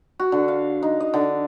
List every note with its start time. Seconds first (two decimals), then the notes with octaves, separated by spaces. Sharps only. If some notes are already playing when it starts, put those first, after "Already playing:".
0.20 F#4
0.32 D3
0.48 F5
0.83 D#4
1.00 D#5
1.14 D3